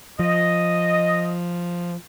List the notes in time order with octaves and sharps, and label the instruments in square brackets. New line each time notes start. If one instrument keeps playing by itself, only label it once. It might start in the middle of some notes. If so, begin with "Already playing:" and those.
[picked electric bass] F3 [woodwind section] D#5